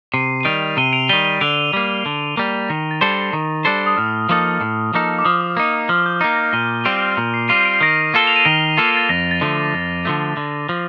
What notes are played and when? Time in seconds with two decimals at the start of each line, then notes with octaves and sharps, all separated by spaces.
0.14 C3 C7 D#7
0.41 D#7
0.45 D#3 G3 D7 F7
0.77 C3 D#7 G7
0.93 D7 F7
1.09 D#3 G3 D#7 G7
1.25 D#7 G7
1.41 D3 D7 F7
1.73 G3 A#3
2.06 D3
2.37 G3 A#3
2.69 D#3 A#6
2.91 A6
3.01 G3 D4 A4 C5
3.12 A6
3.33 D#3
3.65 G3 D4 A4 C5
3.86 D#6
3.97 A2 F6
4.29 F3 A#3 D#4 A4
4.61 A2
4.94 F3 A#3 D#4 A4
5.19 D6
5.25 F3 D#6
5.41 D6
5.57 A#3 D#4 D6
5.73 D#6
5.89 F3 F6
6.06 G6
6.21 A#3 D#4 A6
6.37 A#6
6.53 A#2 D#7 G7
6.81 D#7
6.85 G3 C4 F4 D7 F7
7.17 A#2
7.34 C7
7.49 G3 C4 F4 C7 D#7
7.65 D7
7.74 C7
7.81 D#3 A#6 D7
8.14 A#3 F4 A4 G7
8.27 F7
8.36 D#7
8.45 D#3 A#6 D7
8.77 A#3 F4 A4
8.97 A6
9.09 F2 A#6
9.31 A6
9.41 D3 F3 A3
9.52 D6
9.74 F2
10.05 D3 F3 A3
10.37 D3
10.69 F3